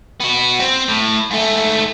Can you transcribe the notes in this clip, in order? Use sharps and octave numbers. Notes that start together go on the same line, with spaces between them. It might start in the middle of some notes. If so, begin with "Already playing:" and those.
B3 F#4
C4
A2
G#2 A3